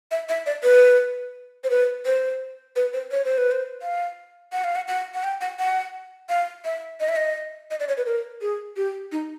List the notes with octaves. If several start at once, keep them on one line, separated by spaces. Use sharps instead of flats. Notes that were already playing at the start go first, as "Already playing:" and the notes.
E5
E5
D5
B4
C5
B4
C5
B4
C5
C#5
C5
B4
C5
F5
F#5
F5
F#5
F#5
F#5
G5
F#5
F#5
F5
E5
D#5
E5
D#5
D#5
D5
C#5
B4
A#4
G#4
G4
D#4